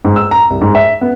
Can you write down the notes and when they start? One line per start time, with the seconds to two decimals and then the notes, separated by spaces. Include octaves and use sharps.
0.05 G#2
0.16 E6
0.31 A#5
0.50 C2
0.61 G#2
0.75 E5
1.01 B3